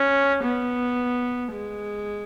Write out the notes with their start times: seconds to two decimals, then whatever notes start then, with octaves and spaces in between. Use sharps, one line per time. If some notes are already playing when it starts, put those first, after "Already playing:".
Already playing: C#4
0.44 B3
1.53 G#3